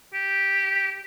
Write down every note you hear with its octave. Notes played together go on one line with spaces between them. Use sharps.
G4